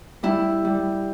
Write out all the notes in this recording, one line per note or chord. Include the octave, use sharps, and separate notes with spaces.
G3 E4
G3